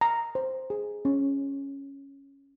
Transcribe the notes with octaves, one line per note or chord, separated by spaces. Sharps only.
A#5
C5
G#4
C#4